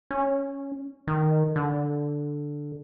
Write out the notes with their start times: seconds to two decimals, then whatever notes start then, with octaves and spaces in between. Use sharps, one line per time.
0.11 C#4
1.07 D#3
1.56 D3